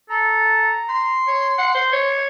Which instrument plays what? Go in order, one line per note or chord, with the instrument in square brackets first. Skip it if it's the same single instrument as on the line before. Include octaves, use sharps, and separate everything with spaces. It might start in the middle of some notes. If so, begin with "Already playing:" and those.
[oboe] A4 [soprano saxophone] A#5
[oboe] C6
[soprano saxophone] C#5
F#5
C5
C#5